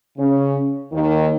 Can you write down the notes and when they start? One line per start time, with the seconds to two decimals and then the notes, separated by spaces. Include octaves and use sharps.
0.18 C#3 C#4
0.92 D#2 D#3